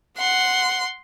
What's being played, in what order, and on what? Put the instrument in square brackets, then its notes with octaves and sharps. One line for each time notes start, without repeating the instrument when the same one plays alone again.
[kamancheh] F#5 [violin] C6